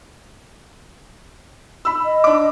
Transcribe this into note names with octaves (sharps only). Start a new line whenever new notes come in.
B5 E6
D#5
D4 D6